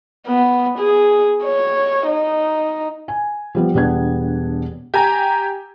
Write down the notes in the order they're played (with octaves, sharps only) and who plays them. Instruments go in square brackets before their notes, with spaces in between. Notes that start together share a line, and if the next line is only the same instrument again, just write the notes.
[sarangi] B3
G#4
C#5
D#4
[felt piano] G#5
F3 G3 B3
E1 G3 B3 D4 G#6
[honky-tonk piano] G4 G#5 A#5